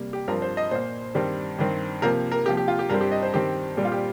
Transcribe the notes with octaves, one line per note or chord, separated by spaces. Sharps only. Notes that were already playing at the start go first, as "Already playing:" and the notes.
Already playing: C3 G3 A#3
G4
G2 F3 C4 A#4
C5
D#5
A#2 A#3 C5
G2 D#3 G3 C4
G2 D#3 C4
C3 F3 A#3 A#4
A#4
C3 F3 A#3 G4
G4
F4
G4
G2 G3 C4 A#4
G4
D#5
C5
G2 D#3 C4 G4
A#2 G3 C4
F4
G4